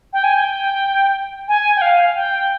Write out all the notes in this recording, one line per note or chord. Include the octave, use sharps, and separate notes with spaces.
G5
G#5
G5
G#5
G5
F5
G5